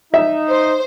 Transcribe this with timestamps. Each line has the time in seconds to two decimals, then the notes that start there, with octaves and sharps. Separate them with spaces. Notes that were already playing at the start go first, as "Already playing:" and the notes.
0.14 D#4 E5
0.49 C5